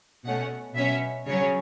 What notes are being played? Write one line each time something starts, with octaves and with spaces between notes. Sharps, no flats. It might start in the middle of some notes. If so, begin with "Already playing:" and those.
B2 A3 C#4 F#5
B2 F#3 C#4 E5
C#3 F#3 C#4 C#5